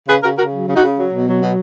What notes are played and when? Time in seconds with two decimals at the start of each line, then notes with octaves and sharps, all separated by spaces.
0.08 C#3 G#4 B4
0.22 C#3 F#4 A#4
0.37 C#3 F#4 A#4
0.53 F#3
0.67 C#3
0.74 D#4 F#4
0.82 C#3
0.97 F#3
1.12 B2
1.27 F#3
1.41 B2